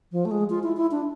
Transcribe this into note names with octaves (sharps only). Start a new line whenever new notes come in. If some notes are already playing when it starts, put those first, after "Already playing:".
F3
A3
G#3
F4
E4
E4
D4